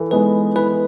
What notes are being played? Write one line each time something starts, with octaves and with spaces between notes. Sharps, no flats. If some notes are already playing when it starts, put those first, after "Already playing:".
Already playing: E3 A4
G#3 B3 D#4 B4
E3 B4